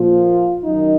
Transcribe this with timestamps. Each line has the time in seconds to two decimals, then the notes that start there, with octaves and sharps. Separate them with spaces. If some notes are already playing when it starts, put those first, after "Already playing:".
Already playing: A#2 F3 F4
0.64 F#2 D#3 D#4